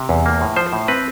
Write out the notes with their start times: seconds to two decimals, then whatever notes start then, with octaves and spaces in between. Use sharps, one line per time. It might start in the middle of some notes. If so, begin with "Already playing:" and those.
Already playing: C3
0.09 E2
0.26 A#3
0.41 A2
0.56 F3 C5
0.73 A2
0.88 C4 B4